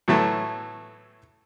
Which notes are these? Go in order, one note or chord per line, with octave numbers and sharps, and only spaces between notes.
A2 E3 F#3 A3 A5